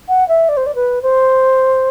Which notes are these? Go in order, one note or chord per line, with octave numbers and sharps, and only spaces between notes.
F#5
E5
D5
C5
D5
B4
C5